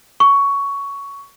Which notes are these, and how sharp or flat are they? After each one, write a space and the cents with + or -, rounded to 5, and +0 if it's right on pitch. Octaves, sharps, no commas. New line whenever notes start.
C#6 +10